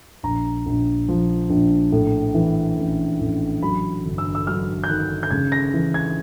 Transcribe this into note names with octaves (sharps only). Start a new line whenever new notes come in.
A#1 A#5
A#1
F3
A#1
A2
E3
A1
A1
F#3 B5
G1
E6
E6
F#3 F6
G6
D#3 F#6
G6
C#3 G#6
A#6
E3
G#6